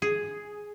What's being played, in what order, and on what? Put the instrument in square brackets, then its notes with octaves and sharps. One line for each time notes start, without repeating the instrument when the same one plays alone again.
[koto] G#4